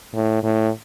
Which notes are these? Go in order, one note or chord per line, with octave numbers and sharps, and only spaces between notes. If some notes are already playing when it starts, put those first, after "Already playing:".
A2
A2